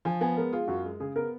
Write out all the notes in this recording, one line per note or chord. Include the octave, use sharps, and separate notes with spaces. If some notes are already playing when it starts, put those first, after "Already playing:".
F3 G#5
B3 G#5
G#3 A#4
F4 G#4
F#2 F#4
G#3
C#3 G#4
B3 A#4